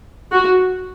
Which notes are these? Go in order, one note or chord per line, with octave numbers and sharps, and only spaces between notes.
F#4